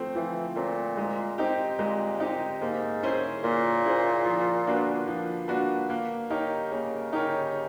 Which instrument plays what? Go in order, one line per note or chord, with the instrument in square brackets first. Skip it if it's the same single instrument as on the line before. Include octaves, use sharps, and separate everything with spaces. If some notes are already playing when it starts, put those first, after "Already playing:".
Already playing: [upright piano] F3 A3 C4
[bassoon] E3 [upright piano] F3
[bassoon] A#2 [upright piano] A3 C4
[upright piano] G#3
C4 D#4 G4
[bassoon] A#2 [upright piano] G#3
[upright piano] C4 D#4 G4
[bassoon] G#2 [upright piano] A#3
[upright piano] C#4 E4 G#4 C5
[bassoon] A#2 [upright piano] A#3
[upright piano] C#4 E4 G#4 C5
F3
A#3 D4 F#4 B4
F3
A#3 D4 F#4 B4
A#3
D#4 G4 A#4 C#5
[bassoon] C#3 [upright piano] A#3
[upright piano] D#4 G4 A#4 C#5